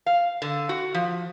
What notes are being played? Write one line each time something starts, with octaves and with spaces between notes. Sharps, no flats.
F5
D3
F#4
F3